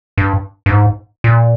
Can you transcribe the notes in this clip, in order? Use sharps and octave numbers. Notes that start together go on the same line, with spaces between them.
G2
G2
G#2
A#2